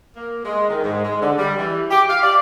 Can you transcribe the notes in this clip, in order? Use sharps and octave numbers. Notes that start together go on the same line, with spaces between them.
A#3
G#3
D#3
G#2
G#3
D3
G3
E3
G4
F5
D5